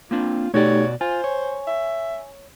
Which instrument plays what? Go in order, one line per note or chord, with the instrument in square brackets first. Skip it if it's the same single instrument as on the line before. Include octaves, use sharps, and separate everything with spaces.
[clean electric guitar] A#3 C4 D4 [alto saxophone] F4
[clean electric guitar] B2 F#4 D5 [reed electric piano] A3 D#4 G4 [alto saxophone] C#5
[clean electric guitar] F4 [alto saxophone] C5 [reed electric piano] G#5
[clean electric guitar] C#5
[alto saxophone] E5